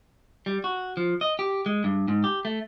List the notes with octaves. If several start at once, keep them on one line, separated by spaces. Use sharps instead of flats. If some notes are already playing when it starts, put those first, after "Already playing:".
G3
F#4
F3
D#5
G4
G#3
G2
G#2
G4
A3